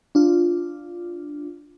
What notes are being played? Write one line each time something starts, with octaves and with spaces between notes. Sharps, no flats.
D4 F4